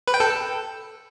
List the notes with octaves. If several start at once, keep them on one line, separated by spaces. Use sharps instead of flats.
B4
G5
A4